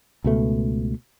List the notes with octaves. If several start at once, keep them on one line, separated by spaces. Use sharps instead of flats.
C#2 B2 A3